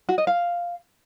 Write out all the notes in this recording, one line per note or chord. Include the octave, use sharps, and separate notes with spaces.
F#4
D#5
F5